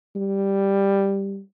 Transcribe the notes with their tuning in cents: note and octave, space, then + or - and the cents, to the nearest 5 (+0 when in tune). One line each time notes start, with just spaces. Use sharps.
G3 +5